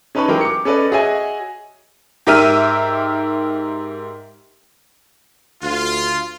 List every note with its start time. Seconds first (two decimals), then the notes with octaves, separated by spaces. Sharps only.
0.15 C#4 D#4 B4 A5 B5 C#6
0.28 E3 F#3 G#3 G4 G#4 A#4
0.41 D6 C#7
0.65 C#4 A4 B4 D5 D#5
0.91 F#4 G#4 C#5 D#5 E5 G#5
2.27 G#2 G4 A#4 E5 F6 D#7
5.62 D2 F4